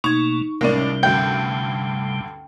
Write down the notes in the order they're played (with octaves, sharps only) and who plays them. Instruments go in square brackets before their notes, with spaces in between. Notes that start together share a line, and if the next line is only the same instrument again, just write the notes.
[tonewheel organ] B2 A3 A#3 [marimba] D#4 G#6 [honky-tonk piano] C#6
[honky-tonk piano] C#2 A2 D5 [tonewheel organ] C3 G3 [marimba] C#4 A#4
[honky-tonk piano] D2 G2 D3 [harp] G5